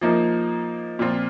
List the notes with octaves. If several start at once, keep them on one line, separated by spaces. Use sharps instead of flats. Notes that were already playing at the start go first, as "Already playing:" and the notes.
F3 A#3 D#4 A#4
A#2 F3 C4 F4